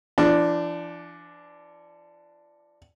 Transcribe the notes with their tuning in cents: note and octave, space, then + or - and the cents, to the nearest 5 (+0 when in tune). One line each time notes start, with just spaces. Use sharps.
F3 -45 D4 +0